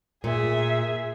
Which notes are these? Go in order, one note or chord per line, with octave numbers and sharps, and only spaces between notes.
A#2 G#4 E5